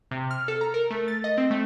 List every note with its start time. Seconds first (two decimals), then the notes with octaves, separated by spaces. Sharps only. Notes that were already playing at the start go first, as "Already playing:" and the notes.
0.11 C3
0.31 F6
0.48 A4
0.61 A#5
0.74 A#4
0.90 A3
1.08 A6
1.24 D#5
1.38 C4
1.51 A3